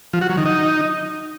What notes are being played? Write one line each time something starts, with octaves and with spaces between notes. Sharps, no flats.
F3
F#4
F#3
D#3
D#4